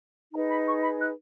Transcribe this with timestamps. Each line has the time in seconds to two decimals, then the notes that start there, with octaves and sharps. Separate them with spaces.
0.33 D#4 G#4 B4 A#5
0.49 B5
0.66 C#6
0.82 B5
0.99 F#6